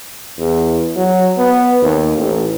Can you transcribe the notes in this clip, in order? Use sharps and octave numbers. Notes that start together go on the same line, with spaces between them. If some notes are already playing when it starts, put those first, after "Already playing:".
E2
F#3
B3
D#2
A1